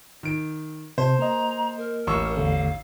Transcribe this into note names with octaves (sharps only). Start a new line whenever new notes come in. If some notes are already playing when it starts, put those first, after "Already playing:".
D#3 D7
C3 C5 A5
A#3 D#5 A#5
A#4
A1 C#6 E6
E2 D3 A3 F5